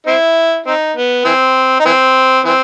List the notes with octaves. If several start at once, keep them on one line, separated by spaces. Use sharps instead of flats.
C4 E4
C4 D#4
B3
E3 C4
D#4
E3 C4
E3 C4